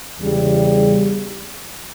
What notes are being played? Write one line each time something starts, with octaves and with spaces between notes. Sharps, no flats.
E2 C#3 G3